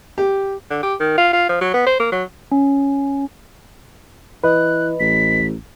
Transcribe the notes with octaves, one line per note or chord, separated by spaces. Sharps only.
G4
D3
G4
D#3
F4
F4
F3
F#3
B3
C5
A#3
F#3
C#4
E3 B4 D#5 F#6
A1 B6